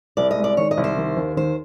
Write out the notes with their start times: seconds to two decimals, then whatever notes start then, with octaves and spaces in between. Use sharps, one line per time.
0.17 C2 D5
0.31 D#5
0.37 G#3
0.44 D5
0.57 D#3 C#5
0.71 D#5
0.77 C2
0.84 C5
0.97 D#3
1.17 D#2
1.37 D#3 C5